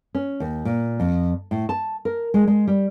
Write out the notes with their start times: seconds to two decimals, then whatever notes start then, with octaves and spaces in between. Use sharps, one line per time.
0.15 C#4
0.40 D#2
0.65 A#2
1.00 F2
1.51 A2
1.69 A5
2.05 A#4
2.34 G#3
2.48 G#3
2.68 G3